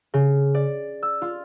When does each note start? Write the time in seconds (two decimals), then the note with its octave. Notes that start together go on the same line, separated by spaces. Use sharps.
0.14 C#3
0.55 D5
1.03 E6
1.22 F4